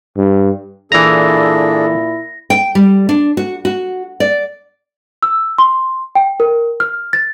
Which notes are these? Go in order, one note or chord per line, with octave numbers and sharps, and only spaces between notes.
G2
A#2 E3 D4 E4 G#4 A4 A#5 A#6
G5
G3
D4
F#4
F#4
D5
E6
C6
G5
A#4
F6
A6